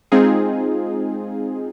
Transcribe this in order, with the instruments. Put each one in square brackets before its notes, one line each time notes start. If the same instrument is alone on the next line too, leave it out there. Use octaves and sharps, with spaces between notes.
[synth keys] G#3 C4 D#4 F4 G#4